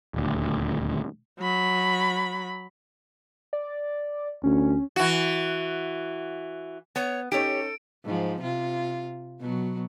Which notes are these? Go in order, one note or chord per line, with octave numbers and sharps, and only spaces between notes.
D#1 D2
F#3 B5
D5
D2 C#4
E3 F#4
B3 C#5
C#4 D#4 G4 A4 C#5 D7
G#2 F3
C3 F4
B2 F#3